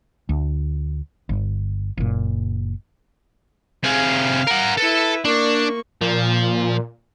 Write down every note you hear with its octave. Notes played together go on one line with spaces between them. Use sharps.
D2
G1
F#1 A#2
C3 G#4 F5
A#4 F#5
E4 A4 B4
A#3 D4 C#6
A#2 F3